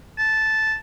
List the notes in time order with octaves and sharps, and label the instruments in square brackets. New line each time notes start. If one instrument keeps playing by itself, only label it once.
[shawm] A5